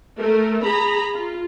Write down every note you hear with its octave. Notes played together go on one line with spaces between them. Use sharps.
A3 A#4
G#4 A#5 B5
F4